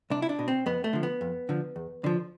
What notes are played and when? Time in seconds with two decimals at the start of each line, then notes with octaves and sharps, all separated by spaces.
0.10 C2 D4
0.22 E4
0.29 D4
0.39 B2
0.48 C4
0.66 F2 B3
0.84 A3
0.93 D3 F3
1.03 B3
1.21 F2
1.49 D3 F3
1.76 E2
2.04 D3 F3